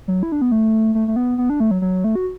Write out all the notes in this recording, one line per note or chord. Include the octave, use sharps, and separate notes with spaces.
F#3
E4
D4
B3
A3
A3
A3
B3
B3
D4
A3
F#3
F#3
A3
F#4